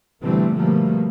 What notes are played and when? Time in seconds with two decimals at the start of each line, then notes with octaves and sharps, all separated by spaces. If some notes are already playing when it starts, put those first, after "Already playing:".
0.22 B2 D3 E3 G3 A3 C4
0.57 B2 F3 G3 A3 A#3